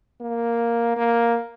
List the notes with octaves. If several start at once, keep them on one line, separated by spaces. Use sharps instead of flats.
A#3
A#3